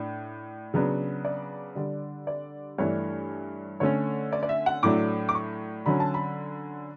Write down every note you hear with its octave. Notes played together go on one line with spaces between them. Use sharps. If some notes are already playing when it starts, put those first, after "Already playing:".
Already playing: A2 D4
C#3 F#3 B3 D4
D5
D3 G3 D4
D5
G2 E3 A3 D4 C#5
D3 A3 C#4 C#5
D5
D5
E5
F#5
A2 F#3 A3 D4 D6
D6
C#6
D3 F#3 C#4 B5
A5
B5